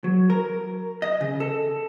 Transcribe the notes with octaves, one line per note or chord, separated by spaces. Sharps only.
F#3
A#4
D#5
C#3
A4